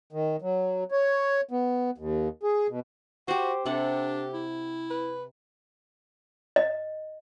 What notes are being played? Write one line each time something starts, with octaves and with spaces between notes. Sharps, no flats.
D#3
F#3
C#5
B3
D#2
G#4
B2
F#4 G4 C5
C3 D4 G4 A4 F#5
E4
B4
D#5